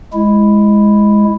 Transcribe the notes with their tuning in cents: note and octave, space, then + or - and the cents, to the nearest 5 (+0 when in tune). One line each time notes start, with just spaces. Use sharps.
G#3 +0 E4 +0